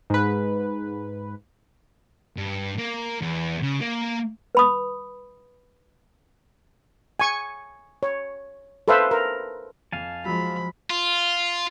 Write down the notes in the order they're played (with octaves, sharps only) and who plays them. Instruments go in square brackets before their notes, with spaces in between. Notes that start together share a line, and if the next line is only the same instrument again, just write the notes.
[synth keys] G#2 B4
[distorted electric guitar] G2
A#3
E2
C#3
A#3
[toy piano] B4 B5 D#6
[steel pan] G#5 C#6
C#5
A4 B4 C5 E5 F5
A#4
[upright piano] F2 [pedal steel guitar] F5 G#5 A5
[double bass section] F3 [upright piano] F#3 G#3 [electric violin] B5
[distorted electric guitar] F4